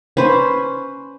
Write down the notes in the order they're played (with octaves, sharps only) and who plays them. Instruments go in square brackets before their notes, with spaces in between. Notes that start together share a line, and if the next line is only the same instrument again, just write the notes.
[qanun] C#4 B4 C5